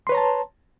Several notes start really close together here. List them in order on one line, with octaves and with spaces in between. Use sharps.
C6 B4 C#5 A#5 A5